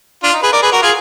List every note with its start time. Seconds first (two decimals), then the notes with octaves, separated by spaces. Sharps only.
0.23 D4 F4
0.33 D#4
0.43 G#4 B4
0.52 A#4 D5
0.62 G#4 B4
0.72 F#4 A#4
0.82 F4 G#4